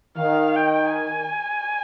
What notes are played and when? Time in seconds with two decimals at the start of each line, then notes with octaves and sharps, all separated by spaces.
0.18 D#3 F5
0.55 G5
0.93 G#5